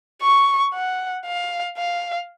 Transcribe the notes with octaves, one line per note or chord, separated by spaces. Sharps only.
C#6
F#5
F5
F5